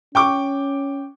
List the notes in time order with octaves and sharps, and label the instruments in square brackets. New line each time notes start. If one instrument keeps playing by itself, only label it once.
[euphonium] C#4 [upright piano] G5 C#6 D6